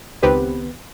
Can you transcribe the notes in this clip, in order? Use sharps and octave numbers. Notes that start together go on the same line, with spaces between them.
C#2 D#3 B3 C4 G4 B4